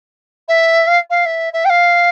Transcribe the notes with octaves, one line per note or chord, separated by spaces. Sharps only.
E5
F5
F5
E5
E5
G5
F5